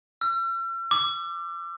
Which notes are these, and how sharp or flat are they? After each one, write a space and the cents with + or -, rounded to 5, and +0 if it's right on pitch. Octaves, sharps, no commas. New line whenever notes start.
E6 +45
D6 +10